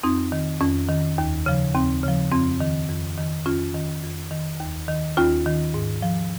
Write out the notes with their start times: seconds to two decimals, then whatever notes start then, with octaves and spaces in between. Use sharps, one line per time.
0.03 F2 C4 D#4
0.32 D#3
0.61 F2 C#4
0.89 D#3
1.18 D#2
1.46 C#3 F3
1.75 D#2 C4
2.03 C#3 F3
2.32 F2 C4
2.60 D#3
2.89 F2
3.17 D#3
3.46 F2 C#4 F4
3.74 D#3
4.03 F2
4.31 D#3
4.60 D#2
4.88 D#3
5.17 D#2 C#4 F4
5.46 D#3
5.74 G#2
6.02 F3